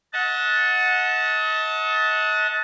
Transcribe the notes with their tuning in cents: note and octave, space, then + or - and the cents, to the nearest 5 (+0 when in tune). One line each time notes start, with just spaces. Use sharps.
D#5 +35 F#5 -15 A5 +0